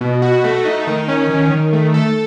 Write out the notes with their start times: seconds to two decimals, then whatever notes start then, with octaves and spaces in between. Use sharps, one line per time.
0.01 B2
0.22 F#4
0.44 A3
0.65 D#4
0.87 D#3
1.08 C#4
1.30 D#3
1.51 D#3
1.73 A3
1.94 A4